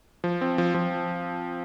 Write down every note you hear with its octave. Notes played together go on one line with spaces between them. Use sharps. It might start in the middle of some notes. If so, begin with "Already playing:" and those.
F3
C4
F3
F3